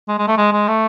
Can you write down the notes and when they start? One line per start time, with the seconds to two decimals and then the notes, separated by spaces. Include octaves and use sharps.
0.08 G#3
0.19 G#3
0.28 A3
0.37 G#3
0.53 G#3
0.68 A3